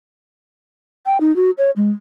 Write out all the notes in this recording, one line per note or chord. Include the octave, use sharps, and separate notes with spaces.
G5
D#4
F#4
C#5
G#3